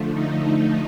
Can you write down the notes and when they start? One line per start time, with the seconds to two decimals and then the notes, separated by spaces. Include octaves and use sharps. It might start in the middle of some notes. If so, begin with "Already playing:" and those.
Already playing: D3 F3 A3
0.11 D#4